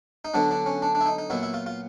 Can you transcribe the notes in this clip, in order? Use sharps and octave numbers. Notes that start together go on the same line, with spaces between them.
D#4
D3 F#3 B3 D4
D4
C#4
D4
D4
E4
D#4
D#4
A#2 F#3 B3 E4
E4
F4
F4